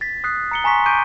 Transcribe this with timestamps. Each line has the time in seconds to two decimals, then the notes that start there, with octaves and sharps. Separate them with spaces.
0.01 A6 B6
0.24 D#6 F#6 C7
0.51 A#5 C#7 G7
0.64 G#5 A#5 C6 C#6 B6
0.86 C#6 D6 G6 D7 D#7